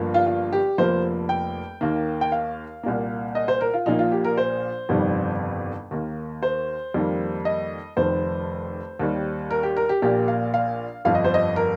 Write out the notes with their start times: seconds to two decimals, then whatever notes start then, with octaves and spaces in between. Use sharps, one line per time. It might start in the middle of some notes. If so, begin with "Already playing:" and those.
Already playing: G1 G2 F3 A#3
0.14 F4
0.26 F4
0.53 G4
0.78 F1 F2 F3 A#3 C5
1.29 G5
1.81 D#2 D#3 A#3
2.21 G5
2.32 F5
2.83 C2 A#2 A#3
3.35 D#5
3.48 C5
3.61 A#4
3.74 F4
3.86 A#1 A#2 F3 A#3 D#4
3.99 F4
4.12 G4
4.24 A#4
4.37 C5
4.89 G1 F2 C3 D#3 G3
5.91 D#2 D#3 A#3
6.43 C5
6.94 F2 D#3 G3 A#3
7.45 D#5
7.97 F1 F2 D#3 C5
8.99 D#2 D#3 G3
9.51 A#4
9.63 G4
9.77 A#4
9.89 G4
10.02 A#1 A#2 A#3 G4
10.28 F5
10.54 F5
11.05 G1 F2 F3 F5
11.15 D#5
11.24 C5
11.34 D#5
11.56 A#4